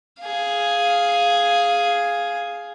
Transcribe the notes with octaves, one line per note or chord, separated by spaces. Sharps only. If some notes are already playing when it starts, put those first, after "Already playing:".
G#4 F5